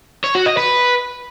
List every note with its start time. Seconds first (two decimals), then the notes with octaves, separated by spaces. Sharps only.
0.24 C#5
0.35 F#4
0.46 D#5
0.57 B4